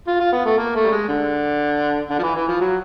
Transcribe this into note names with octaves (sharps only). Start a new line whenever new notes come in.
F4
F4
B3
A3
A#3
A3
G3
G#3
D3
D3
F3
E3
E3
F3
F#3